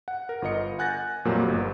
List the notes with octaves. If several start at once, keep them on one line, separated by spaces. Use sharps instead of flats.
F#5
A#4
G1 F4 A#4 D#5 C#7
F#5 G#5 F#6 G6 A6 A#6
F2 A#2 F#3 G3 A#3
G1